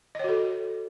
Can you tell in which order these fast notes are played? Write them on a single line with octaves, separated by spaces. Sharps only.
D#5 C#5 F#4 A4